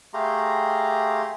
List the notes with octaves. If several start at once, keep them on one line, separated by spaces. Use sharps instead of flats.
A3 G4 G#4 F5 A#5 C6